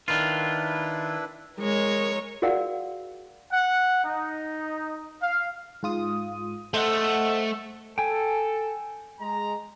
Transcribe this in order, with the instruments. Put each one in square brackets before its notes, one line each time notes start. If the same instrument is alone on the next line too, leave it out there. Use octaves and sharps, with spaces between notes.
[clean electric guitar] D#3 F4 [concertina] D4 E4 B4
[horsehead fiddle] G#3 [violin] A#4 C#5
[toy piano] F#4 G#4 A#4 D5 F5 F#5
[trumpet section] F#5
D#4
F5
[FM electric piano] G#2 F4 D#6
[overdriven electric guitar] A3 [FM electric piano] C5 D#5 F#5
[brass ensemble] A4 [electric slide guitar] G5 G#5
[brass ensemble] G#3 A#5